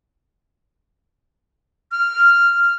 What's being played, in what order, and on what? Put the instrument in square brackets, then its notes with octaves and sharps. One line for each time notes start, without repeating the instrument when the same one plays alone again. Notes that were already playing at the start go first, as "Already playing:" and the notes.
[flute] F6